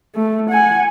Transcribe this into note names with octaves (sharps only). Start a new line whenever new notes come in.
A3
F#5 G#5